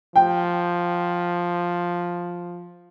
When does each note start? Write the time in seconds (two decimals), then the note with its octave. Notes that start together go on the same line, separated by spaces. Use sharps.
0.16 F3 G5